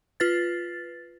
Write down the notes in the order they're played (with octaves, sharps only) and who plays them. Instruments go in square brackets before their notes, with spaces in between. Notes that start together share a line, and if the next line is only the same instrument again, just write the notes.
[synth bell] F4 B4 A6